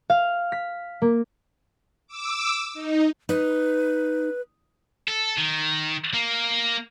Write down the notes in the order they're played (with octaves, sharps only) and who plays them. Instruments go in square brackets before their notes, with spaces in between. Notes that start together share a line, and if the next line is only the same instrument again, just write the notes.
[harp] F5
B6
A#3
[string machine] D6 E6
D#4
[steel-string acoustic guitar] D#4 [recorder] B4
[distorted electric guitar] A4
D#3
A#3